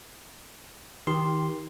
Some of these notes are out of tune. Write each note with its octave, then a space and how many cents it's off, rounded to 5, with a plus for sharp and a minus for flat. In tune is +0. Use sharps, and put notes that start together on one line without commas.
D#3 +30 G4 +0 C6 +0